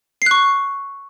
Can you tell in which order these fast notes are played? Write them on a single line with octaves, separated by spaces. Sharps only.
C7 F#6 C#6